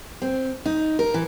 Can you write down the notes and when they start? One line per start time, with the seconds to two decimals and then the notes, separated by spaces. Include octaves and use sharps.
0.22 C4
0.66 D#4
0.99 A#4
1.14 E3